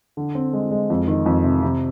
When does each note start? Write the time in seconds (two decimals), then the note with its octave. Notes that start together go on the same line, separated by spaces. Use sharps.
0.17 D3
0.35 C4
0.53 G#3
0.71 G#3
0.90 F2
1.08 D#3
1.26 F2
1.44 C3
1.62 C3